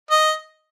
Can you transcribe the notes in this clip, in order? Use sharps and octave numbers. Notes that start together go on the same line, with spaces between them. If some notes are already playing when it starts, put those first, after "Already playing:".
D#5